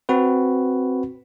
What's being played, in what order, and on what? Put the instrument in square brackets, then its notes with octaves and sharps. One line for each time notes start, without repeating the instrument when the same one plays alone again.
[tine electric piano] C4 F#4 B4